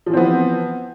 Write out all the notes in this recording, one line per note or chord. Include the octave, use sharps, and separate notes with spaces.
E3 F3 B3 C4